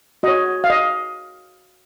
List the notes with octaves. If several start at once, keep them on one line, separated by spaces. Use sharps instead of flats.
F#4 C#5 D#5
F5
D#5